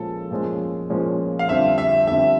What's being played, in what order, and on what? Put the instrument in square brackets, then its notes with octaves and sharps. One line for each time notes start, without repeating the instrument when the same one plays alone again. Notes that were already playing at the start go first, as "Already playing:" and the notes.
Already playing: [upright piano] A#2 F3 G#3 C#4 [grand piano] A4
[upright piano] A#2 F3 G#3 C#4
A#2 F3 G#3 C#4
[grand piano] F5
[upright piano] F2 D3 G3 C4 [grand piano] E5
[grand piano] E5
[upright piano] F2 D3 G3 C4 [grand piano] E5